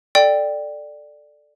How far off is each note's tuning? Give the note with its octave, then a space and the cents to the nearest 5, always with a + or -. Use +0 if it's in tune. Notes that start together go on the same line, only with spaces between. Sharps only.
A4 +0 D5 +10 G5 +0